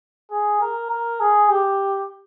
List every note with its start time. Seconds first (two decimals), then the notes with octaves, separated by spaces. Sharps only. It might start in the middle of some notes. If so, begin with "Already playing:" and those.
0.32 G#4
0.61 A#4
0.91 A#4
1.21 G#4
1.50 G4